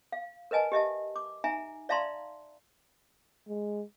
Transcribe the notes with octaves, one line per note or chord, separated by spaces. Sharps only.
F5
A#4 B4 D#5 G#5 A5
G4 D#5 E5 A5
D6
D#4 E5 G#5 A#5
D5 E5 F5 A5 A#5 C6
G#3